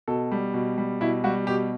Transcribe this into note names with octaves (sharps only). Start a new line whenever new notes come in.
B2 A4
G3
B2
G3
B2 E4
G3 F#4
B2 G4